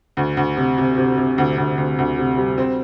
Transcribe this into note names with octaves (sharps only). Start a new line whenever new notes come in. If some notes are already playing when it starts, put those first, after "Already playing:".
D2
D2
C3
C3
C3
C3
D2
D2
D2
D2
C3
G3
C4